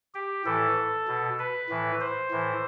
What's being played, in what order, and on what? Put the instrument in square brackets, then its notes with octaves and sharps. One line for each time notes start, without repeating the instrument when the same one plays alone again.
[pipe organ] G4
A2 E3 A4
B2
B4
A2 E3
C5
A2 E3